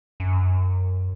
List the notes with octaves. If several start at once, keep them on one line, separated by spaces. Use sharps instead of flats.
F#2